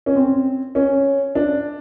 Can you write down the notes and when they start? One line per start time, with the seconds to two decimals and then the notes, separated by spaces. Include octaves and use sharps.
0.06 C#4
0.15 C4
0.75 C#4
1.35 D4